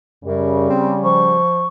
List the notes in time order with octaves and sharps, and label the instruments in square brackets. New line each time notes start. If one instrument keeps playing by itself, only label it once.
[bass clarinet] F#2 [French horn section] C#3 G3
[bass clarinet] C4
[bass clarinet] F3 [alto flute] C#6